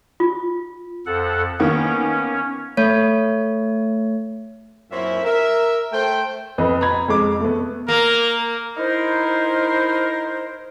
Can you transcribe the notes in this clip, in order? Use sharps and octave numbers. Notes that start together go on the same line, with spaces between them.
F4
F2 A4 F#5
D#3 A#3 B3 C#4
A3 C#5
F#2 A#2 C4 C#4 E4 E5
A#4 E5
A3 A4 C5 G5
F2 B4 D#5
A#5 B5 G#6
F2 G#3 D6
A3 B3
A#3 A#4
D#4 E4 A#4 C5